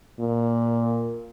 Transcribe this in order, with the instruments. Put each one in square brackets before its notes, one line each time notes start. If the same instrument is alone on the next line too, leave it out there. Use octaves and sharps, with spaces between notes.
[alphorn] A#2